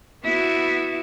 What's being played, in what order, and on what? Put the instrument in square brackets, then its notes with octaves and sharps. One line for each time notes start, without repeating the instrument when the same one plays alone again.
[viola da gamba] B3 E4 F#4